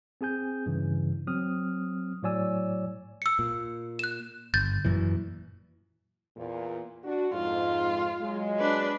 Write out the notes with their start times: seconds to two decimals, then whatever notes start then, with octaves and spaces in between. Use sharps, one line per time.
0.21 C4 G#4 G#5 G6
0.66 G2 C#3 E3
1.27 F#3 C4 D#6 F6
2.23 A2 F#3 C#5 D5 G#5 E6
3.22 E6 C#7
3.39 A#2
3.99 F#6 E7
4.54 G1 G6 A6
4.85 F#2 A#2 E3
6.36 E2 A#2
7.04 D4 F#4
7.33 F2 G#2 F4
8.22 F#3 G#3
8.59 D4 B4